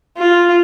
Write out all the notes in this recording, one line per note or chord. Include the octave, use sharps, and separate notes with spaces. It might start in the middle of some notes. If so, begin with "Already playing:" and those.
F4